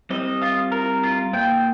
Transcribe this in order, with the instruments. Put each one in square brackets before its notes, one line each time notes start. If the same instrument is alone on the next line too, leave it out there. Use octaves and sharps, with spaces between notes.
[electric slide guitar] G3 C4 [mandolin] D#5
[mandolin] F4
A#4
F4
[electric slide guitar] A#2 [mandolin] G5